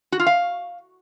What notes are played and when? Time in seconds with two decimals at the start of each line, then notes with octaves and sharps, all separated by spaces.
0.12 F#4
0.19 F4
0.27 F5